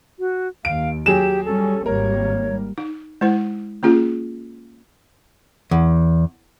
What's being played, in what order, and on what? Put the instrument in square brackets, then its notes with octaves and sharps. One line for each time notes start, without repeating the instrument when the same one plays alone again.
[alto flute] F#4
[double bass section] D#2 [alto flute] F5 [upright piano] D7
[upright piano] F#3 G#4 E7 [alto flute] G4
[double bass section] G3 C#4 [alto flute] A4
[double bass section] G#1 G3 A#3 [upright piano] A#4 [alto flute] C#5
[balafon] D#4
G#3 E4 C5
A#3 C#4 F4 G#4
[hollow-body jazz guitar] E2